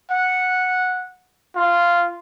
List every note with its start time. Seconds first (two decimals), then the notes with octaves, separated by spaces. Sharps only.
0.10 F#5
1.55 F4